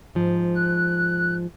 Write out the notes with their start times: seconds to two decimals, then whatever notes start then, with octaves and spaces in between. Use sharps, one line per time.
0.15 G#2 F3
0.55 F#6